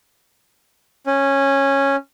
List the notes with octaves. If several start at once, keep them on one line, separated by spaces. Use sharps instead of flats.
C#4